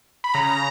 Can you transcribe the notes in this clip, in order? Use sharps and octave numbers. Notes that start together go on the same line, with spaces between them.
B5
C#3 A#5